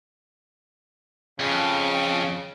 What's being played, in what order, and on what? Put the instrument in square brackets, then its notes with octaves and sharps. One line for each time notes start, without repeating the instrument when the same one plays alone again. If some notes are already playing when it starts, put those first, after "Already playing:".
[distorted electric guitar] F2 [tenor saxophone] C#3